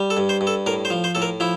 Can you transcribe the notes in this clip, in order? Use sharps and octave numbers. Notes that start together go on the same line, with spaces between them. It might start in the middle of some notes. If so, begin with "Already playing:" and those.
Already playing: G3
A4
G2
C5
G2
A4
A2 A#4
C5
F3
C5
A2 A4
A#4
F3 E4